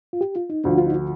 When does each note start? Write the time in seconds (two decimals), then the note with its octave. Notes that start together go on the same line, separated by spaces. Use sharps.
0.13 F4
0.21 G4
0.36 F4
0.50 D#4
0.64 D2 D3 F3 D4
0.78 F4
0.86 D#4
0.93 F4